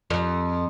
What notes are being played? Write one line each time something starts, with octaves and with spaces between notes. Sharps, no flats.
F2